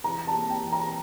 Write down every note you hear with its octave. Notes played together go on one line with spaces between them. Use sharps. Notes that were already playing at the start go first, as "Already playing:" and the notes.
E3 A#5
A5
A#3
G5
E3
A#5